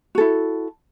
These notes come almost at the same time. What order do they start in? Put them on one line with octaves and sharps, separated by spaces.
F#4 A4 E4